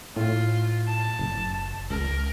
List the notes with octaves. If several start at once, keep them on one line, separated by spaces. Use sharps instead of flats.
A2 F4
A5
F#1
C#2 A#4